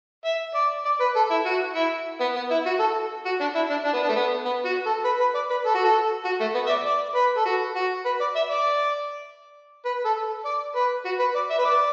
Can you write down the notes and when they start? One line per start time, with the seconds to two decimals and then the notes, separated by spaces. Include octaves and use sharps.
0.25 E5
0.55 D5
0.85 D5
1.00 B4
1.16 A4
1.30 E4
1.45 F#4
1.75 E4
2.20 B3
2.36 B3
2.50 E4
2.66 F#4
2.80 A4
3.25 F#4
3.40 D4
3.55 E4
3.70 D4
3.85 D4
3.93 B3
4.02 D4
4.09 A3
4.15 B3
4.45 B3
4.65 F#4
4.86 A4
5.04 B4
5.20 B4
5.35 D5
5.50 B4
5.65 A4
5.74 F#4
5.84 A4
6.25 F#4
6.40 A3
6.54 B3
6.66 E5
6.69 D5
6.85 D5
7.15 B4
7.37 A4
7.45 F#4
7.75 F#4
8.05 B4
8.20 D5
8.35 E5
8.50 D5
9.85 B4
10.05 A4
10.45 D5
10.75 B4
11.05 F#4
11.19 B4
11.35 D5
11.50 E5
11.59 B4
11.65 D5